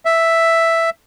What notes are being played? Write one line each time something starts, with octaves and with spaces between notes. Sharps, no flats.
E5